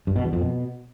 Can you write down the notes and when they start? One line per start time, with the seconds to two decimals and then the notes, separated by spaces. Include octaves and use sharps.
0.07 G2
0.16 B2
0.24 E2
0.33 F2
0.41 B2